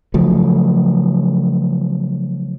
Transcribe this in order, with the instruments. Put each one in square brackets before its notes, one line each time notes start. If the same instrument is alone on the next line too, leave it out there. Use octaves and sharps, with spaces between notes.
[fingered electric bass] C#3 F3 F#3 A3